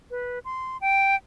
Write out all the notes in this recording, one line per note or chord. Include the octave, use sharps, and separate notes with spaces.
B4
C6
G5